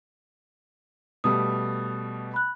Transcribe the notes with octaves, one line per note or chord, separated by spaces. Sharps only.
B2 G3 A3 D#6
B5 F#6